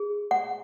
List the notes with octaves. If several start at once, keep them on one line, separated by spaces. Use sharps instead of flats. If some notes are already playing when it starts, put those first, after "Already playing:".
Already playing: G#4
F#5